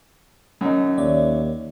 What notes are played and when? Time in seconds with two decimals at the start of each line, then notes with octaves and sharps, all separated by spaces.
0.61 F#2 D#4
0.98 D#2 C#5 D5 E5